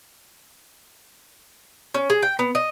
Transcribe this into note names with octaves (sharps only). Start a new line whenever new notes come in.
C#4
G#4
G5
B3
D#5